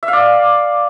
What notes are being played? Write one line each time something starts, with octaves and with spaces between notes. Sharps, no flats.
E5
F5
D5